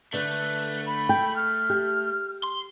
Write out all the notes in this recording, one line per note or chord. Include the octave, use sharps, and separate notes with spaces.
D3 A3 B4
B5
G5
F6
G4
C6